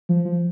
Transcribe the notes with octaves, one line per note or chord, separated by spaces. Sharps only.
F3
F3